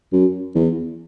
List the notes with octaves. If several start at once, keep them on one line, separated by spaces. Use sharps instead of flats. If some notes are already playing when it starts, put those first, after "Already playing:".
F#2
E2